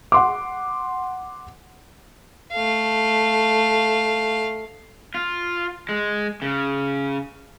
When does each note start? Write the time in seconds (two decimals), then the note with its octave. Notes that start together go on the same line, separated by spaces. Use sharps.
0.12 F#5 C6 D6
2.52 A3 F5
5.15 F4
5.89 G#3
6.42 C#3